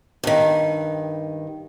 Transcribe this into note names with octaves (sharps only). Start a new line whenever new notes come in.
G2 D#3